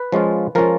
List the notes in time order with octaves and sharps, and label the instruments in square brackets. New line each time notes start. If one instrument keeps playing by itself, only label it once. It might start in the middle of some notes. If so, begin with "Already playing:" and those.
Already playing: [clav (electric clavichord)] B4
F3 G#3 C#4 F4
F3 G#3 C#4 F4 A#4